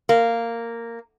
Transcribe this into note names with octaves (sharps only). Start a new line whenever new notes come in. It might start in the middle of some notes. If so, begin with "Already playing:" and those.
A#3